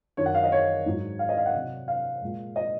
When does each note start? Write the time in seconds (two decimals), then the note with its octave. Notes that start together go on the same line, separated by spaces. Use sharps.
0.17 F#2 D#3 F#3 C#5
0.26 F#5
0.35 F5
0.43 D#5
0.52 C#5
0.85 G#2 F#3
1.19 F5
1.29 D#5
1.37 F5
1.46 F#5
1.54 C3 F#3
1.88 F5
2.22 A#2 G#3
2.56 D#5